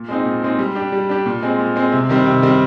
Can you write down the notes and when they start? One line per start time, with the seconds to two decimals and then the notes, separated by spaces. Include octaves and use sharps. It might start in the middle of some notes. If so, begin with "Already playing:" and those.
Already playing: A#2
0.08 G#3 C4 D#4
0.25 A#2
0.42 G#3 C4 D#4
0.59 G3
0.75 D4 G4
0.92 G3
1.09 D4 G4
1.26 A#2
1.43 G#3 C4
1.59 A#2
1.76 G#3 C4
1.92 C3
2.09 D#3 G3 C4
2.26 C3
2.42 D#3 G3 C4